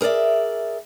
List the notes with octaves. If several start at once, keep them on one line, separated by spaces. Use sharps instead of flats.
G#4 A#4 B4 D5 E5